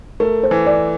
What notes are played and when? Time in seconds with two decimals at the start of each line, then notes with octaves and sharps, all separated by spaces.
0.20 A3 A#4
0.43 C5
0.51 E3
0.66 D5